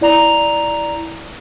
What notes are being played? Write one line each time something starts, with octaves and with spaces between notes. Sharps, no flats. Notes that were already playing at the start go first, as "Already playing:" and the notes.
E4 D5 A#5 F7